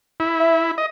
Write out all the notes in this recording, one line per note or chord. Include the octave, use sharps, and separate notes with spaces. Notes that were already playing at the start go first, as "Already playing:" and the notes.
E4
E5
D#5